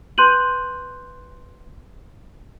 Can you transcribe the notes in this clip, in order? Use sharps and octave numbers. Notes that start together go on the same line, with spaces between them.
B4 C6 F#6 G6 D#7 F#7